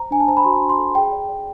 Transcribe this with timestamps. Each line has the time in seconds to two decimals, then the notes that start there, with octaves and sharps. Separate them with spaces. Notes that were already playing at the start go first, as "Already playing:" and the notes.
Already playing: C5 A#5
0.11 D4 G#5
0.20 A5
0.28 C5 A#5
0.37 B5
0.44 F#4 C6
0.61 D4
0.70 C6
0.78 A4
0.95 G#4 G5
1.12 D5
1.29 D5